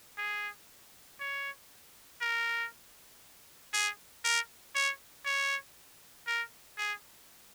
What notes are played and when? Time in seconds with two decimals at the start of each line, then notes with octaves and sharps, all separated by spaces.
0.18 G#4
1.20 C#5
2.21 A#4
3.74 G#4
4.24 A#4
4.75 C#5
5.25 C#5
6.27 A#4
6.78 G#4